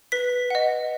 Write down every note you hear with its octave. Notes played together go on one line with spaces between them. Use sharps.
B4 B6
D#5 F#5